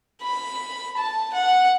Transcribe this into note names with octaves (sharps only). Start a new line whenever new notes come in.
B5
A5
F#5